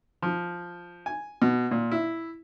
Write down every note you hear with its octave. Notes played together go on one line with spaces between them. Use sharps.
F3
G#5
B2
A#2
E4